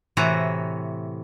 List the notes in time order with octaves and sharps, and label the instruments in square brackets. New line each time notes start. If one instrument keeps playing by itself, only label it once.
[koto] A2 C3 E3 F#4 A#5